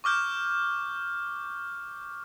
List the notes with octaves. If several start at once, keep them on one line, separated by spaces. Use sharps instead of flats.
C#6 D6 F6 G6